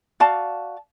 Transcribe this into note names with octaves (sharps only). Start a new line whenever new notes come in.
F#4 D5 F5 A5